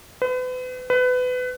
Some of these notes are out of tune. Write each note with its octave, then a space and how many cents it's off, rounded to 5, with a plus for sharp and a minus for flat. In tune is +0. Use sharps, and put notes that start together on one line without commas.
B4 +40
B4 +25